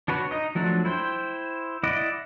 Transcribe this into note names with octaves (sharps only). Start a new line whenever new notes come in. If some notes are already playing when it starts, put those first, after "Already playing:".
D4 F#4 B4 C#5
D#4 D#5
F3 F#3 A3 D4
E4 C5 G5
E4 D5 D#5 F#5